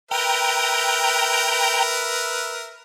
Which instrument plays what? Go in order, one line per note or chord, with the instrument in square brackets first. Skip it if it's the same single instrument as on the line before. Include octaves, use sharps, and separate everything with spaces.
[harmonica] A#4 B4 E5 [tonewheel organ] G5 A#5